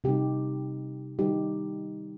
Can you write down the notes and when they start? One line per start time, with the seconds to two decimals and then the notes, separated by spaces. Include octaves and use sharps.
0.04 C3 G3 D#4 G4
1.19 D#3 G3 D#4 G4